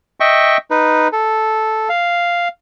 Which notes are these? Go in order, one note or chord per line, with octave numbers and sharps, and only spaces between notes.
D#5 E5 G5 C#6
D#4 B4
A4
F5